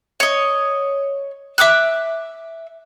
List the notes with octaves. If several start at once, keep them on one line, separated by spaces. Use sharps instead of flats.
C#5 D#5
E5 D6 E6 F#6